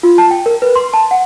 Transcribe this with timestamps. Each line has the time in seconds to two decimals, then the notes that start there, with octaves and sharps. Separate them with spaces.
0.03 F4
0.18 A5
0.31 G5
0.46 A#4
0.62 B4
0.76 C6
0.94 A5
1.11 F#5